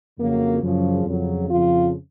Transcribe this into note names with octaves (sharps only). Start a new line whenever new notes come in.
F2 C#3 F#3 A#3
F#2 C#3 F3
F2 C#3 F#3
F2 C#3 F3 F4